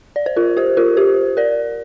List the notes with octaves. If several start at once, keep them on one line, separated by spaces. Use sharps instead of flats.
D5
C5
F4 A#4
G4 C5
F4 A#4
G4 C5
A#4 D5